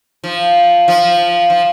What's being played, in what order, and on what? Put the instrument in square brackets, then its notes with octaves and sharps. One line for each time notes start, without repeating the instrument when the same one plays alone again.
[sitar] F3
F3
F3